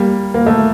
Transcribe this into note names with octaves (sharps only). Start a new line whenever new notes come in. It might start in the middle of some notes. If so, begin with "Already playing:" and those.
Already playing: G3 A#3
A#3
A3